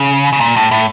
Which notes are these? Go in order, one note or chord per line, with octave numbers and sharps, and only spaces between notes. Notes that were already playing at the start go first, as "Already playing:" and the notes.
Already playing: C#3
C#3
A#2
A2
A2